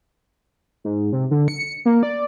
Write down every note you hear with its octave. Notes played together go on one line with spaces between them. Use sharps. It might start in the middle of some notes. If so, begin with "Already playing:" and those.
G#2
C3
D3
C#7
A#3
D5